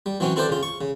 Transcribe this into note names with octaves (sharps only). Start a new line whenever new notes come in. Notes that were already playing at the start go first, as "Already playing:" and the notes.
G3
E3 F#3 C4 C#4
C4 E4 A4 B4 C5 D5
C#3 F4
C#6
C#3